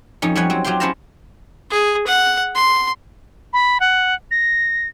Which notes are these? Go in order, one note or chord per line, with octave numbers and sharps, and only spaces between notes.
F2 C#4 D#4
F3 G3 C#5 F#5 G#5
F#3 C4
F#3 F4 G4 G5 C6
C#4 E4 C5 F5 A5 A#5
G#4
F#5
C6
B5
F#5
A#6